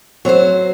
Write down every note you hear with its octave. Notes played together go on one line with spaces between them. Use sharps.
F#3 C4 F#4 C5